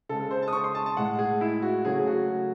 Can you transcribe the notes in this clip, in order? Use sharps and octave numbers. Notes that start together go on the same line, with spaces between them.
C#3 G#3 A4
A4
C5
A5
D#6
C#6
C6
A5
A5
A2 G#3 F#5
G#4
E4
F#4
C#3 F#3 A3 G#4
G#4
F#4